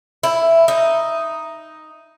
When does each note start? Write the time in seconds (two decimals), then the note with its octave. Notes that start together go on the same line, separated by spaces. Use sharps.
0.23 E4
0.68 D#4